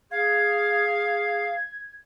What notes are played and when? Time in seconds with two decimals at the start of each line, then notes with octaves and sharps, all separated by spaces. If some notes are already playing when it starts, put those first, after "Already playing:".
0.11 G#4 F5 G#6